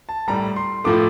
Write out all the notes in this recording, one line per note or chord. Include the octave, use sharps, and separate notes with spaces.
A5
A2 G3 A#5
C6
A2 F3 A3 D6